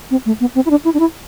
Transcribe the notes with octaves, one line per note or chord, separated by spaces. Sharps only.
C4
A3
B3
C4
E4
D4
E4
D4
E4